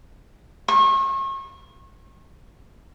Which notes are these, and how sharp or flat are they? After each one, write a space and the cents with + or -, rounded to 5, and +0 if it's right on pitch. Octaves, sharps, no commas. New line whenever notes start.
C#6 -40